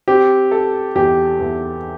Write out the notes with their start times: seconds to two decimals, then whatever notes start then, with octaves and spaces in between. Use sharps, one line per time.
0.08 C4 G4
0.51 A4
0.95 E2 G4
1.39 E2